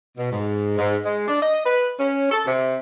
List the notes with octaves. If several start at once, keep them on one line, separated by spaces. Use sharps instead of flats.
B2
G#2
G#2
G#3
D4
D#5
B4
C#4
A4
C3